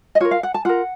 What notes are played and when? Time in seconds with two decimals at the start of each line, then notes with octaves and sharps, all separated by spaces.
0.15 D#5
0.20 F4 A#4 C#5
0.31 F5
0.43 F#5
0.54 A5
0.65 F4 A#4 F#5